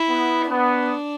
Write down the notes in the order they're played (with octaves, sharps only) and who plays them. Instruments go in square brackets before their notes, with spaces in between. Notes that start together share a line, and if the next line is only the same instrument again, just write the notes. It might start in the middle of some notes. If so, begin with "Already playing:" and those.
Already playing: [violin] E4
[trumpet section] B3
[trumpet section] B3 [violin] D4